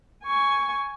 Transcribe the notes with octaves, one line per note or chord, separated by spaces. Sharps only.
G#5 C#6